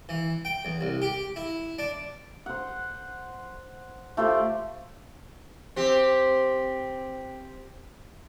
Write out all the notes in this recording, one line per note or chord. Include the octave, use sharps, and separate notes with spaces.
E3
G5
E2
C2
G4
E4
D4
C5 F#5
A3 F4 G4 C5
C4 G4